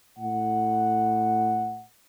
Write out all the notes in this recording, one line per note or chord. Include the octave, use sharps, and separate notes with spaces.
A2 F#5